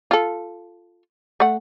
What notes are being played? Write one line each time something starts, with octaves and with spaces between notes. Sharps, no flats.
F4 A4
A3 F#5